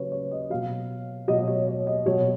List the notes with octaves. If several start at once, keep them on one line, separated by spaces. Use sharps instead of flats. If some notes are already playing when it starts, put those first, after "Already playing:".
Already playing: C#3 F#3 B4 C#5
C#5
D#5
B2 F#3 F5
B2 F#3 D#5
D#5
C#5
C#5
D#5
B2 F#3 C#5